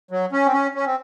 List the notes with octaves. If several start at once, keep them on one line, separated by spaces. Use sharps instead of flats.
F#3
C#4
C4
C#4
C#4
C4